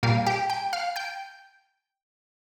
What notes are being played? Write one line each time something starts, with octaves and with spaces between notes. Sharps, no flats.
A#2 G3 A#3 F5
G4 G5
G5 G6
F5 F6
G5 G6